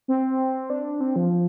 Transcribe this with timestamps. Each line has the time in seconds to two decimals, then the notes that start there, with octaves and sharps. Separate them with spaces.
0.08 C4
0.70 D4
1.01 C4
1.16 F3